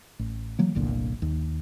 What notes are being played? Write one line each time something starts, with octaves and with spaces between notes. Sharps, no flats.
A1
E3 F#3 A#3
G1 C2 A#2 D3
D#2